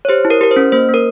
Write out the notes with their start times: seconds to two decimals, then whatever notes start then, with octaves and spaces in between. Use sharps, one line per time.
0.05 C#5
0.09 G4 C5
0.25 E4
0.30 A#4
0.41 G4 A#4
0.51 C5
0.56 C#4
0.72 A#3 C5
0.89 A#3 A#4